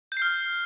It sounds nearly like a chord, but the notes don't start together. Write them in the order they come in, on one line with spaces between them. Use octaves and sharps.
G6 C7 F6